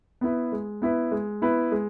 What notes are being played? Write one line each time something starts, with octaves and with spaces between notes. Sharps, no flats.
B3 E4 B4
G#3
B3 E4 B4
G#3
B3 E4 B4
G#3